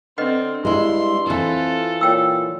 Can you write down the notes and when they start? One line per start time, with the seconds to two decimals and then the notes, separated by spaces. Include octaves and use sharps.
0.18 D3 C4 B4 D#5 F#5
0.65 G2 G#3 E4 C6
1.26 F2 E3 F4 A4 C5
2.01 A#2 C#5 G5 E6